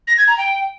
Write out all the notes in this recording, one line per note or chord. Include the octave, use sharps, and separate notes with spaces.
A#6
G#6
A#5
G5